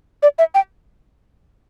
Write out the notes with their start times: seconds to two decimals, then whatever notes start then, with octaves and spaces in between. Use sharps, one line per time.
0.23 D5
0.38 E5
0.54 G5